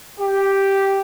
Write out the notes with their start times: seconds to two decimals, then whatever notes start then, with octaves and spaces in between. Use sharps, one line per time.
0.19 G4